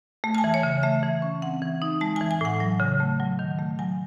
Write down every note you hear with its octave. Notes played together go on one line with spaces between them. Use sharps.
A3
A5
G#5
E3
C#5
C#3
A3 E5
E3
C#4
C4 F#5
E3
D#4
G#3 A5
E3 G#5
G#5
A2 F#5
F#3
C#3
A3
F#3
D#3
A3
F#3 G#5